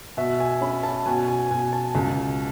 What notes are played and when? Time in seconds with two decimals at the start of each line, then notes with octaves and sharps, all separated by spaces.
0.17 B2 E5
0.40 G#5
0.61 C#4 B5
0.83 A5
1.06 B2 G#5
1.28 G#5
1.50 B2 G#5
1.73 A5
1.95 C#2